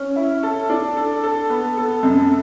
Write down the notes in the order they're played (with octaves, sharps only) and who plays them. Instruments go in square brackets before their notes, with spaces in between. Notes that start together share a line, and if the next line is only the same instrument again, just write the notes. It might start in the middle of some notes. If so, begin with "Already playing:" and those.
Already playing: [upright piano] C#4
E4
A4
D4
A4
A4
B3
A4
F#2